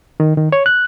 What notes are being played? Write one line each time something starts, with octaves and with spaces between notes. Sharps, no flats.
D#3
D#3
C#5
F#6